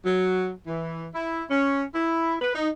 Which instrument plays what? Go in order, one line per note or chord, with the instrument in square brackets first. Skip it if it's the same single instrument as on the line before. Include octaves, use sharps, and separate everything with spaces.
[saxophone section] F#3
E3
E4
C#4
E4
B4
D#4